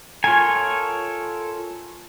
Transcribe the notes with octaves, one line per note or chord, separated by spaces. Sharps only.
F4 A4 A#4 C#5 G#5